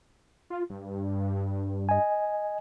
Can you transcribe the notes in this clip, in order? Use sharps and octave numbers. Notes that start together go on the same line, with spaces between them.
F4
G2
D#5 G#5